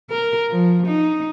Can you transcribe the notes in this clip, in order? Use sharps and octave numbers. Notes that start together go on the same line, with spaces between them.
A#4
F3
D#4